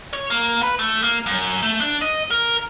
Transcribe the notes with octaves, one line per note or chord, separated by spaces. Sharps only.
C#5
A#3
B4
A3
A#3
F#2
A3
D4
D#5
A#4